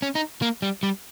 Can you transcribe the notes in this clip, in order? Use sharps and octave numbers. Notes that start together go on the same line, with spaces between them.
C#4
D#4
A#3
G3
G3